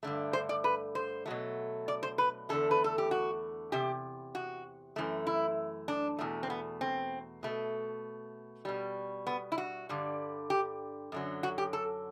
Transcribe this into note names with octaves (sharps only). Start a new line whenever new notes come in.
G2 D3 A3
C5
D5
B4
C5
B2 F#3 A3
D5
C5
B4
E2 D3 A3 A4
B4
A4
G4
F#4
E2 C3 G4
F#4
F#2 E3 A3
E4
D4
E2 B2 A3
C4
B3
C4
B2 A3
B2 G3
B3
E4
F#4
G2 D3 G3
G4
F#2 D3 F#3
F#4
G4
A4